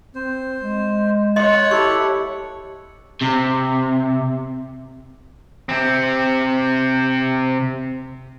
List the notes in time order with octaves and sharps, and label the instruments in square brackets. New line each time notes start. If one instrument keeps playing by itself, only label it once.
[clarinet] C4 [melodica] C5
[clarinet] G#3
[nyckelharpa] C#5 F#5 [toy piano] D#5 C6
[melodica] E4 A4 [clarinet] G4 [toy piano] C#6
[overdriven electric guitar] C3
C3 C4